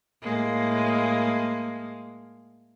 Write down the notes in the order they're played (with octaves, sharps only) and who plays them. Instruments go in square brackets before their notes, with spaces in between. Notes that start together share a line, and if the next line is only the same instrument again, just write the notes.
[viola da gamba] A2 G#3 A#3